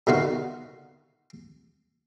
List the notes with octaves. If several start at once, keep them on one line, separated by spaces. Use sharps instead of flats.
B2 D3 D#3 F4 F#4 F5